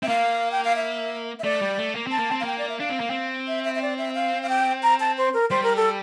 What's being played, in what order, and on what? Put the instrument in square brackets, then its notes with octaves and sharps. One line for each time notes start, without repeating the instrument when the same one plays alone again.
[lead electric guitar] C4 [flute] E5
[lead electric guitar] A#3 [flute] F5
[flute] G5
F5
E5
E5
[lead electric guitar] A3 [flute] D5
[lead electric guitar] G3
A3
A#3
[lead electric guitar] C4 [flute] A5
[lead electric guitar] A#3
C4
[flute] F5
[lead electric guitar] A#3 [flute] G5
[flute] D5
E5
[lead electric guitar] D4 [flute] F5
[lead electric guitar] C4
A#3
C4
[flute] E5
E5
E5
D5
E5
F5
F5
G5
A#5
A5
C5
A#4
[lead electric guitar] G3 [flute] C5
[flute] A#4
A4